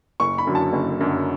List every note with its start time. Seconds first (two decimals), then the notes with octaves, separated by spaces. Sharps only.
0.20 F#1 C#6
0.38 B5
0.47 F#2 D3 F#3
0.55 A5
0.73 F#1
1.01 F#2 D3 F#3